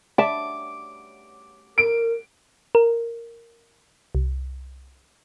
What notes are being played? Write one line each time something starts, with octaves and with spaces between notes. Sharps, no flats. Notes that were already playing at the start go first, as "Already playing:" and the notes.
D5 E5 A5 D6
A#4 D7
A#4
C2